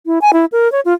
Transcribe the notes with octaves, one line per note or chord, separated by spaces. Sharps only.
E4
G#5
E4
A#4
C#5
F4